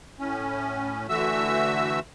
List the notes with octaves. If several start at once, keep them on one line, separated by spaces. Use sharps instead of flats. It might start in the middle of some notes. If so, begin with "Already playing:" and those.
A2 C#4
D3 E3 A3 F#4 E5 E6